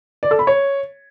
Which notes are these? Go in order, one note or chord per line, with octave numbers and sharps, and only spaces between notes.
D5
A4
B5
C#5